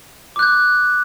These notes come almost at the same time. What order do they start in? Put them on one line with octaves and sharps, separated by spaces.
D6 F#6 G6